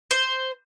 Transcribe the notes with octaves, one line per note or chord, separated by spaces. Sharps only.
C5